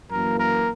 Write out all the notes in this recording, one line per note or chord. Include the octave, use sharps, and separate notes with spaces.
F#2 E3 A#3 A#4
A#4